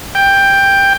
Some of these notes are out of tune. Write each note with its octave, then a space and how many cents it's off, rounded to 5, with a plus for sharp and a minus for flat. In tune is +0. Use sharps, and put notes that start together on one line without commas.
G5 +10